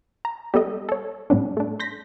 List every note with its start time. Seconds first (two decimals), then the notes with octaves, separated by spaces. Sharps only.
0.25 A#5
0.54 G3 B3 A4 D#5
0.89 A4 C#5
1.30 A2 G3 B3 C#4 D4
1.57 A3 D4
1.79 C6 G6 A#6 B6